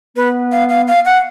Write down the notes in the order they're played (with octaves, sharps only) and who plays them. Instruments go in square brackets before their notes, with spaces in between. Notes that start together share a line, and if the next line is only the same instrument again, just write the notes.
[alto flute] B3 [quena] B4
[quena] F5
F5
F5
F#5